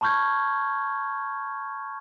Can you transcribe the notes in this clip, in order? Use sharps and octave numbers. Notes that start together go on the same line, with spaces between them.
A5 B5 C#6 F6 G6 G#6